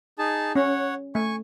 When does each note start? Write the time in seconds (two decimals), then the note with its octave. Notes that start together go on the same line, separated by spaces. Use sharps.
0.19 D#4 G#4 A5
0.55 C#4 C#5 F#5
1.15 A3 G#5 C#6